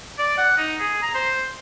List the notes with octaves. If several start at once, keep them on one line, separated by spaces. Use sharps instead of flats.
D5
F#5
D#4
G#4
A#5
C5